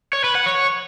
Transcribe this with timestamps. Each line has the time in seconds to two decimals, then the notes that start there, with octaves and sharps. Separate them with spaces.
0.13 C#5
0.24 B4
0.35 F#5
0.46 C#5